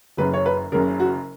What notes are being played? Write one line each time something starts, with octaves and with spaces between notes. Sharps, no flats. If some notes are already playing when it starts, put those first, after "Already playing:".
F#1 F#2 C#3 B4
C#5
B4
F#1 F#2 C#3 A#4
F#4